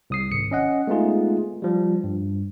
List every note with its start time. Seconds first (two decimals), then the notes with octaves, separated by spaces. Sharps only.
0.10 C2 D#6 C7
0.31 G#1 C#7
0.51 C#4 D#5 F#5
0.87 G#3 A3 B3 D#4 F4 G#4
1.62 F3 G3
2.04 G2